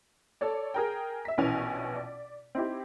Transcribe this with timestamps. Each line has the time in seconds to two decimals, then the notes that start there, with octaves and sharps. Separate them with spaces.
0.41 A4 C#5 D5
0.74 G#4 A#4 G5
1.25 E5 B6
1.38 A#1 B2 E3 C#4 G#5 F7
1.96 D5
2.55 C4 D#4 E4 G4